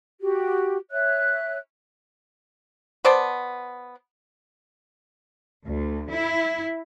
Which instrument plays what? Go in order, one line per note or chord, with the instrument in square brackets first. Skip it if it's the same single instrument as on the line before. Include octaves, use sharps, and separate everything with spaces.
[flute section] F#4 G4
C#5 E5 F#6
[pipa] B3 C5 D5 A5
[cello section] D2
E4